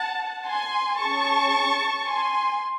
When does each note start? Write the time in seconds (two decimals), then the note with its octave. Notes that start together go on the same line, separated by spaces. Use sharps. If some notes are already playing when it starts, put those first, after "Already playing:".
Already playing: F#5 A5
0.46 G#5 C6
0.99 C#4 G#4 A5 C#6
2.06 G#5 C6